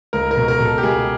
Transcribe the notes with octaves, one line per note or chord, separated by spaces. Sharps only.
C#2 A#4
A#4
B2
A#4
B2
A4
G4
C#2 G#4